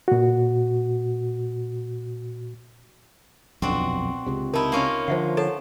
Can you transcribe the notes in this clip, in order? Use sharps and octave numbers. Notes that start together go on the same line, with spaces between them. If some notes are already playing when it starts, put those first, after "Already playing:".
A#2 F#4
D#1 B1 F2 C4 D4 F#4
C#2 C3
D#4 E4 A#4 A5
A#3 C#4 F4
D3 F3 C5 E5 F#5
A4 C#5 F#5 A5